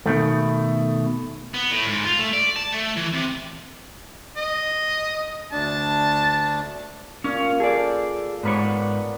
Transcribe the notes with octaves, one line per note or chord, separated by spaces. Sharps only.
B2 D#3 A3
B3
A2
G#2
F4
A3
D5
A5
A3
E3
C3
D#5
D2 D4 A5
A#2 C#4
G#4 A4 D5
G#2 B3 A#4 B4 C#5 D5